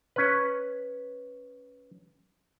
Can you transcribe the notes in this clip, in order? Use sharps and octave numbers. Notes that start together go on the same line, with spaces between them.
C#4 B4